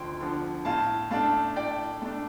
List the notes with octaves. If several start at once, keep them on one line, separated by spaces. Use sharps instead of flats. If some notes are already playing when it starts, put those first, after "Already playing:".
Already playing: D2 D3 F3 G5 C6
D3 F3
A2 F5 A5
A3 D4 F5 A5
A2 D5 G5
A3 D4